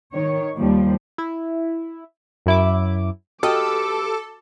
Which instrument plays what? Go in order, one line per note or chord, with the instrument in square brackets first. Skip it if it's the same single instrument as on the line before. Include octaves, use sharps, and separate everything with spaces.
[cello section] D#3 C#5
D#2 F3 G3
[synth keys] E4
F#2 E4 D6
[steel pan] F#4 D#5 D#6 [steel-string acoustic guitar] G4 B4 F5 [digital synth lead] A4 [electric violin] D6